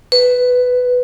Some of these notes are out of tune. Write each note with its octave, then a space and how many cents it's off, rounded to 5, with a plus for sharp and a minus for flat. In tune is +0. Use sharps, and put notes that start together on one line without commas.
B4 +10